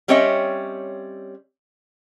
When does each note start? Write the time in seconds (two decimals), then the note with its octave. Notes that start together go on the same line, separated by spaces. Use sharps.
0.08 G3 C4 C#4 C#5 D#5 E5